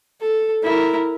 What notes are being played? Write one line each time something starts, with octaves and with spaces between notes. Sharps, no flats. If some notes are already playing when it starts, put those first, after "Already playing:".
A4
E4 A#4